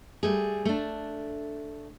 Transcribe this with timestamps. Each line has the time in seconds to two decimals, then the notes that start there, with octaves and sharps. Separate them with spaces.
0.23 G3 A3 G#4
0.65 A3 D4